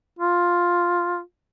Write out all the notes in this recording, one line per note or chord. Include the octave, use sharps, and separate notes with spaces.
F4